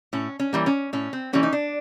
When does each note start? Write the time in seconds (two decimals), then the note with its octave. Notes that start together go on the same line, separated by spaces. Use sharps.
0.13 A2 C#4
0.40 C#4
0.53 E3 G3 A#3
0.66 C#4
0.93 A2 C#4
1.13 C4
1.33 E3 G3 A#3 C#4
1.43 D#4
1.53 D4